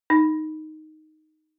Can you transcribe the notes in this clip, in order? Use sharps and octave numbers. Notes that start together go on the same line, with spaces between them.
D#4